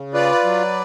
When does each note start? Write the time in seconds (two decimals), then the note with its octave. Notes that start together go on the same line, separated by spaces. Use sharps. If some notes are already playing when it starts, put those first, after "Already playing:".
Already playing: C#3
0.14 F4 B4 D5
0.44 F#3